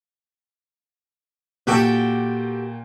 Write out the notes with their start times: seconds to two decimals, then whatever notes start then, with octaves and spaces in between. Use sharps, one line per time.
1.67 A#2 F#4 G4 A4 G5